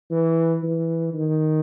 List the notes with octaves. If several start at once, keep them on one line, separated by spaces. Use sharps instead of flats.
E3
E3
D#3